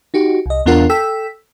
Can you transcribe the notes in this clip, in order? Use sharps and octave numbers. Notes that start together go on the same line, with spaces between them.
D#4 F#4 G4
C2 D#5
E2 B3 D4 F4 A#4 F#5
A4 G5 E6 B6